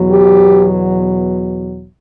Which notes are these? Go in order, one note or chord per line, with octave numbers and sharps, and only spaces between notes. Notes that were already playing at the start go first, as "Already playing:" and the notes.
Already playing: E2 B2 F#3
G4